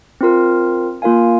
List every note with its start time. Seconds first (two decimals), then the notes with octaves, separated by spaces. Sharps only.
0.21 C4 F4 A#4
1.02 A#3 F4 A#4 F5 G#5